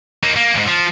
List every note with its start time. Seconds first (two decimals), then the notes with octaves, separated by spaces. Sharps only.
0.23 A#3 D#4
0.36 A#3
0.54 E2 G#2
0.68 F3